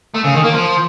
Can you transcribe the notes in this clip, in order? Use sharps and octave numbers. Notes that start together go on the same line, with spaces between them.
A3
C#3
D#3
A#3
F3